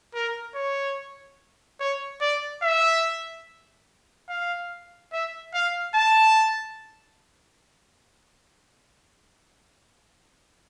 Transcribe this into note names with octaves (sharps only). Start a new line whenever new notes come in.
A#4
C#5
C#5
D5
E5
F5
E5
F5
A5